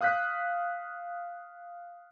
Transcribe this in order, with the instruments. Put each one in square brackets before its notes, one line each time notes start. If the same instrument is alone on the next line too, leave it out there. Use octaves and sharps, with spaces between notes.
[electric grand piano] F5 D#6 F#6 G6 B6